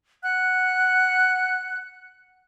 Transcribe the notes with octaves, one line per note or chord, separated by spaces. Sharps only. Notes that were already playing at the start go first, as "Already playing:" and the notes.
F#5 F#6